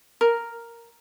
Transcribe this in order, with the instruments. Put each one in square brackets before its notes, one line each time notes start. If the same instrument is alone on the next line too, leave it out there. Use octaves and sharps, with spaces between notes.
[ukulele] A#4